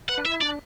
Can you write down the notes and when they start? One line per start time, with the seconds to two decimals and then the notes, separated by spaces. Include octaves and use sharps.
0.09 B4 F#5
0.18 D4
0.25 E4 E5
0.41 D4 D5